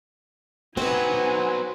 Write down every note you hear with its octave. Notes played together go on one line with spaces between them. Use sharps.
F#3 B3 C4 D#4 B4 F#5 G#5